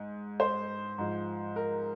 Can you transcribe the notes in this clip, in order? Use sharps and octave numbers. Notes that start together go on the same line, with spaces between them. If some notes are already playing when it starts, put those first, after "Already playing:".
Already playing: G#2
C5
G#2 F3
A#4